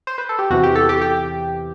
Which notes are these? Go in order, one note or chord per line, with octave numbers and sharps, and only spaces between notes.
C5
B4
A4
G4
E2 C3 E3 F#4
G4
A4
G4
G4